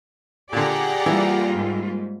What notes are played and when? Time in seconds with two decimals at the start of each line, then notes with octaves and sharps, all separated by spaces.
0.53 A#2 D3 G4 G#4 D5 F#5 A#5
1.06 E3 G3 A#3 F4
1.53 G#2